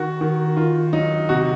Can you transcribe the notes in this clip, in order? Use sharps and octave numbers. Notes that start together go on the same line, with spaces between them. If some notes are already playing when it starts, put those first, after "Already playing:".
Already playing: D#3 F#4
D#3
D#3 F4
F#3 D#4
C3 F#4